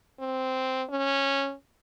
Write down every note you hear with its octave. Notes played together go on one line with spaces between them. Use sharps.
C4
C#4